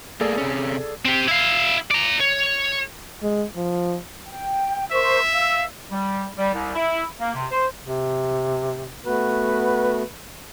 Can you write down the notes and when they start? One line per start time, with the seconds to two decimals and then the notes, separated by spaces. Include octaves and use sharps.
0.21 A3 A#3 G#4 A4 D5
0.38 C3 C#4
1.05 C4 G4
1.28 E4 F5
1.91 D5 A#5
2.21 C#5
3.23 G#3
3.56 F3
4.28 G5
4.91 A#4 C5 E5 C#6
5.32 F5 E6
5.91 G3
6.38 G3
6.53 C2
6.75 E4
7.20 A#3
7.34 C3
7.52 C5
7.84 C3
9.06 A3 B3 F#4 B4